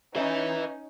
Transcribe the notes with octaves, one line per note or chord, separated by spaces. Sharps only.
C#4 D#4 B4 E5